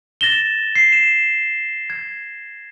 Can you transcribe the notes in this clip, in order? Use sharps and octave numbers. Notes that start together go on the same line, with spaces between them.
A6 A#6 E7 G7
C7
E7
G#6